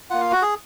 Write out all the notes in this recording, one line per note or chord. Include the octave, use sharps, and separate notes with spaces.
A#3 F4 F#5
F5
F#4
G#4